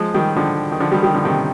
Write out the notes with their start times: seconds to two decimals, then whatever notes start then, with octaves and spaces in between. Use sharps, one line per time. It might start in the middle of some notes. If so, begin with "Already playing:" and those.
Already playing: F3 G#3
0.14 D#3 G3
0.36 D3 F3
0.72 D#3
0.80 D3 F3
0.91 D#3 G3
1.03 D#3 G3
1.14 D3 F3
1.25 C3 D#3